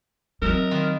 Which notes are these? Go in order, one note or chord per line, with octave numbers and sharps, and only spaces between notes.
F#3 C4 D#4 A#4 E5
D#3 F4 B4